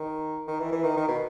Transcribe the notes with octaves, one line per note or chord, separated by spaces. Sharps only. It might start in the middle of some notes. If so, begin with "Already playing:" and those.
Already playing: D#3
D#3
E3
E3
D#3
D#3
B2